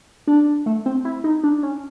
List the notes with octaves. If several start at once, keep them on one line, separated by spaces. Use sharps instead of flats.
D4
A3
C4
E4
D#4
D4
C#4